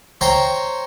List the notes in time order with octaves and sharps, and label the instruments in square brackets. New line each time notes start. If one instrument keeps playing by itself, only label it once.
[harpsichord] C5 C#5 G5 A#5